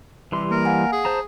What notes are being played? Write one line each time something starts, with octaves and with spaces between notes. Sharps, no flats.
C3 E3 G3 C6
A#3 A#4
F5 F#5 G#5
G#4
C5 A5 A#5